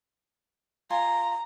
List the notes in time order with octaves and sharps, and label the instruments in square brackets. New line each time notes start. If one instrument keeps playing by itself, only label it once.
[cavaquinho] F4 G#5 C6 [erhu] A#5